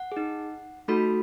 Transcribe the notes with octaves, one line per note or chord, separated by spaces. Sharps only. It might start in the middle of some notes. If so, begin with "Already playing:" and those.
Already playing: F#5
D#4 G#4
A3 D#4 F#4 A4 B5